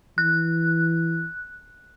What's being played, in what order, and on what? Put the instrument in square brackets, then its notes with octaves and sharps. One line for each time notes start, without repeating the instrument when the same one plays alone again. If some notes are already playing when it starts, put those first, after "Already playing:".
[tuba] E3 [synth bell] F#6